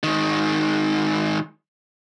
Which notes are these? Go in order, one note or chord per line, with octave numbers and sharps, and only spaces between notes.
G#2 D#3